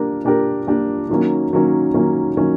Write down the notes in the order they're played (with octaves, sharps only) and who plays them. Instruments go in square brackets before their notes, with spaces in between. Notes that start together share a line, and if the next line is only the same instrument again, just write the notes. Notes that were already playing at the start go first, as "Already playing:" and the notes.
Already playing: [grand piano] A#3 D4 G4 A#4
A#3 D4 G4 A#4
A#3 D4 G4 A#4
D#3 F#3 A#3 C#4
D#3 F#3 A#3 C#4
D#3 F#3 A#3 C#4
D#3 F#3 A#3 C#4